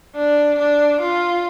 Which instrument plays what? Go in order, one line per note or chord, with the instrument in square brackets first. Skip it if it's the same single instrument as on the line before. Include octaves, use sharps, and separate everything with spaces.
[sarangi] D4
D4
F4